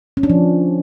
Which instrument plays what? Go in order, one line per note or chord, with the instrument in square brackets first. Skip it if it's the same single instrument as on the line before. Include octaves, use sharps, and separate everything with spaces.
[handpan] C#4
D4
F3